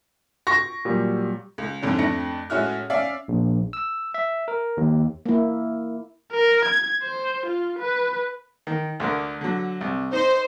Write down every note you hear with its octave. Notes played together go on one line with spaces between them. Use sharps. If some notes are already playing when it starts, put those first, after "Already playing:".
C#6 A#6
A#2 F#3 G3
C#2
F2 G#2 D3 C#4
F2 A3 D4 A#6 C#7
A2 G#3 C#4 E4 F#4 F6
C#4 D5 E5 F5
A#1
E6
E5
A#4
D#2
A#3 E4
A#4
G#6
C5
F4
B4
D#3
D2 D3 A#4
D3 F#3
C2
D#4 C5